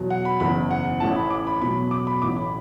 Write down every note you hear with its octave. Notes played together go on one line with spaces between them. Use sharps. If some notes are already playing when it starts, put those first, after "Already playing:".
Already playing: E2 B2 F#3
F#5
B5
F#1 E2 E3 B5
F#5
A1 A2 E3 A5
B5
D6
B5
E2 B2 F#3 B5
D6
B5
A1 A2 E3 D6
B5